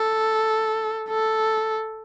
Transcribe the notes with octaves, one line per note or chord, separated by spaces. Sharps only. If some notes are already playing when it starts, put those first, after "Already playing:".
Already playing: A4
A4